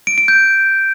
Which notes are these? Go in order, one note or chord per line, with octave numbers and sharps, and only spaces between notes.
D7
D7
G6